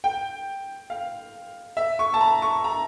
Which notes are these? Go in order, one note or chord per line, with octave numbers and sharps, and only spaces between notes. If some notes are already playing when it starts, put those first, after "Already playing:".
G5
F5
E5
C#6
A5
A#5
C#6
A#5